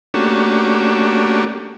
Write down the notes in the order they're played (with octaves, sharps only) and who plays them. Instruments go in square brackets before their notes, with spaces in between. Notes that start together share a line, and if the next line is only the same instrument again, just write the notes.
[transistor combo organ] A3 A#3 C#4 D4 F#4 G4